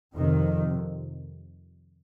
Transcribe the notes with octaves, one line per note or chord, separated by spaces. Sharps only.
F2 C3 D#3